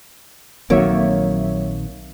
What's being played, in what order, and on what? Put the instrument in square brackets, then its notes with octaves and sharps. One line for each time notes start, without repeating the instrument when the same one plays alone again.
[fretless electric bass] A#1 D#3 C4 [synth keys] F#3 C#5 E5 [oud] A#3